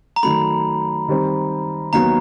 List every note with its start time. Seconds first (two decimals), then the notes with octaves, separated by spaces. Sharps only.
0.16 A#5
0.23 D#3 F#3 A3 B5
1.08 D#3 G3 C4
1.93 D#2 D#3 F#3 B3 A#5